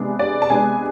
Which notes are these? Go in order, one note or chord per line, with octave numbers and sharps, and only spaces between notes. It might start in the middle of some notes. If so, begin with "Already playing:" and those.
Already playing: C3 G#3 B3 D4
D5
A5
C3 G#3 B3 D4 G#5